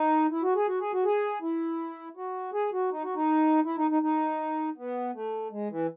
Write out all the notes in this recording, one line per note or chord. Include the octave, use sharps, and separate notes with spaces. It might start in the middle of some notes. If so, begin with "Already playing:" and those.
Already playing: D#4
E4
F#4
G#4
F#4
G#4
F#4
G#4
E4
F#4
G#4
F#4
D#4
F#4
D#4
E4
D#4
D#4
D#4
B3
A3
G#3
E3